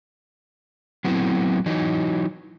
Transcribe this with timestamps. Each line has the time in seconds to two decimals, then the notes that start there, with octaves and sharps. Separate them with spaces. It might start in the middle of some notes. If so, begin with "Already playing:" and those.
1.05 F#3 A3 B3 C4 E4
1.66 E3 F#3 D#4